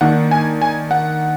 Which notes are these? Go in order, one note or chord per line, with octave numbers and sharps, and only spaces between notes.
D#3 A#3 D4 F#5
G#5
G#5
F#5